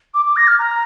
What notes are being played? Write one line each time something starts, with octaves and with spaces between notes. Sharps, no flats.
D6
D6
A#6
F6
A#5